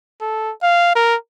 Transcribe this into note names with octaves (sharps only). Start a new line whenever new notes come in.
A4
F5
A#4